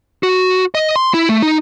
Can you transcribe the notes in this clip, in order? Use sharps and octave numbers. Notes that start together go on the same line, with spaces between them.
F#4
D#5
C6
E4
A3
D#4